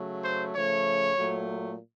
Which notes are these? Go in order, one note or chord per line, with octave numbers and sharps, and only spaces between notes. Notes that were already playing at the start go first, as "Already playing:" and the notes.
Already playing: C#3 F#3 A3
C5
C#3 F3 A3 C#5
A#2 F#3 A3